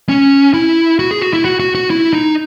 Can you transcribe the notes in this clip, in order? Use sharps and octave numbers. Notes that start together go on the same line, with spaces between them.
C#4
E4
F#4
G#4
F#4
E4
F#4
F#4
F#4
E4
D#4